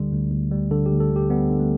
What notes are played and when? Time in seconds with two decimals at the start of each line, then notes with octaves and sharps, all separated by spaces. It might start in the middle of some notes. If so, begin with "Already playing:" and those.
Already playing: D2 D3 G3
0.12 D2
0.31 D2
0.51 G3
0.71 D3 A4
0.86 D2 G4
1.00 A4
1.11 D2
1.16 G4
1.30 G3 B3
1.50 D3
1.60 A3